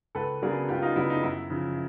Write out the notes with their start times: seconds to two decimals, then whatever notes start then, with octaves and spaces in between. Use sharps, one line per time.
0.15 C#2 A4 B4
0.42 C#3 F#3 B3 D4 G#4 A#4
0.69 C#2 F4 G4
0.82 D#4 F4
0.96 C#3 F#3 B3 D4 E4
1.10 D#4
1.23 F#2 E4
1.50 C#3 F3